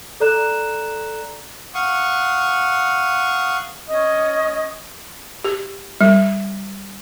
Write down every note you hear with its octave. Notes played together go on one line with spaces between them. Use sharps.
A4 D5 A#5 F#6 E7
F5 F#5 C#6 D#6
C#4 D#5 D#6
G4
G3